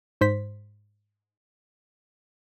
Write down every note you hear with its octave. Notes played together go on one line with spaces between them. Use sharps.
G#2 C5 B6